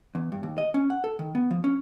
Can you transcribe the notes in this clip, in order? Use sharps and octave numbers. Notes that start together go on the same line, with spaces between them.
E2
G2
D#2
D#5
C#4
F#5
A4
D#3
B3
F3
C#4